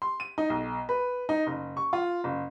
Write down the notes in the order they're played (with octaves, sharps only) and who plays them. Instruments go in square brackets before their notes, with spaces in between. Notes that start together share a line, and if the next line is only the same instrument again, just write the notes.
[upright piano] C6
D#7
D#4
B1
B4
D#4
F#1
C#6
F4
F#1